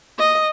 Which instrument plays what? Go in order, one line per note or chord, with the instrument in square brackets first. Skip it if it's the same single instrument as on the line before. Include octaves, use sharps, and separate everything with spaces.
[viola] D#5